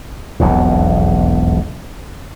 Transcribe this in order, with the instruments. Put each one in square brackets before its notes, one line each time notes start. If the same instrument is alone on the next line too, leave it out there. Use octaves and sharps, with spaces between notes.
[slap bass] E1 B1 F2 G#2